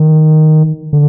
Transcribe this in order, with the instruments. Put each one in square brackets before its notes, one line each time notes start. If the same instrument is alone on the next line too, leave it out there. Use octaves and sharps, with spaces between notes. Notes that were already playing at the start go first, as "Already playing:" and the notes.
Already playing: [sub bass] D#3
D3